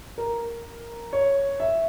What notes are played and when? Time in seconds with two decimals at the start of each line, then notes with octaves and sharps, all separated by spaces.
0.18 A#4
1.13 C#5
1.60 E5